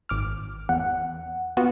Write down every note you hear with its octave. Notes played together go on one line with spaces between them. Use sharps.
G#1 D6 F6
E2 F#5
B3 F4 F#4